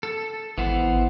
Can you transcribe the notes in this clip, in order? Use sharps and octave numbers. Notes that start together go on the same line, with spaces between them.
A4
G#1 E3 B3 C5